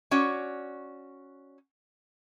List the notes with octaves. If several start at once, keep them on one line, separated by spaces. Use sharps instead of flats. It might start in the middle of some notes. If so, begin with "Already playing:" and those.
C#4 F#4 D5